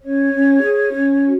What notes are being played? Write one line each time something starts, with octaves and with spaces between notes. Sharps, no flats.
C#4 C#5
C#4
G#4
C#4
F#4